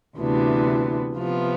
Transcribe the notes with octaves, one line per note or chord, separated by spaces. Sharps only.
D2 C3 E3 B3 D4
C3 F3 B3 F4